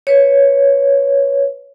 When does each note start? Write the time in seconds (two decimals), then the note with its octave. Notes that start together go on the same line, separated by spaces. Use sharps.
0.07 B4 C#5